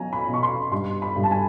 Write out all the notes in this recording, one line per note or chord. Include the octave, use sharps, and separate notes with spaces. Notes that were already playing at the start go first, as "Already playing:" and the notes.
Already playing: B2 F#3 G#5 A#5
B5
B2
C#6
C6
G2 C6
B5
G2
A5
G#5